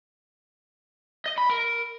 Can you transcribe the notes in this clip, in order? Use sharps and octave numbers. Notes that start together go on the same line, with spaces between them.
D#5
B5
A#4